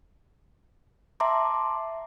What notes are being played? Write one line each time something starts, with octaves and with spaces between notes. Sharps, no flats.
E5 A5 A#5 C6 D6